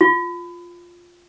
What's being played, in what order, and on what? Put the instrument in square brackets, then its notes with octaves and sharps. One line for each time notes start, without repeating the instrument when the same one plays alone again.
[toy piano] F4